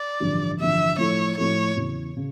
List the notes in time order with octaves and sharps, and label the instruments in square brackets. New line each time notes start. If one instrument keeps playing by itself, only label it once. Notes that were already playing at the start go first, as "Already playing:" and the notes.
Already playing: [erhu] D5
[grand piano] A1 G2 D3 F3
[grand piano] A1 G2 D3 F3 [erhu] E5
[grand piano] A2 F3 A3 E4 A4 [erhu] C#5
[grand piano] A2 F3 A3 E4 A4 [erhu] C#5
[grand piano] E2 C#3 E3
C#3